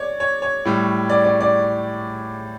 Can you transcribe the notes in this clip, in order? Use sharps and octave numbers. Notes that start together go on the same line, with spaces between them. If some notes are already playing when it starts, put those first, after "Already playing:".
Already playing: C#5 D5
C#5
C#5
A2 G3
D5
D5
D5